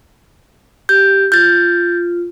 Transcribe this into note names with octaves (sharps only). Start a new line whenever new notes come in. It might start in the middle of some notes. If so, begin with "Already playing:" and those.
G4 G6
F4 G6 A6